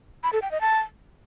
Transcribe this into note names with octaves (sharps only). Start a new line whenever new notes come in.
B5
A4
G5
D#5
A5